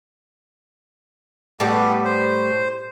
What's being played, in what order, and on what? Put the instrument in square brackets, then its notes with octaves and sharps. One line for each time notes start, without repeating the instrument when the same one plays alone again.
[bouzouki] A2 G3 B4 [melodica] B3 G4 A4
[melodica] C5